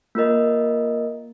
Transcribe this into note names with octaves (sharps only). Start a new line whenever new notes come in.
A#3 F4 A#4 D#5